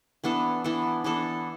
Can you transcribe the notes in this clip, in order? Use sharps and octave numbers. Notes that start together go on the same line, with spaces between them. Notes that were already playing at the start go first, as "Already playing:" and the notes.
E3 B3 D4 A4
E3 B3 D4 A4
E3 B3 D4 A4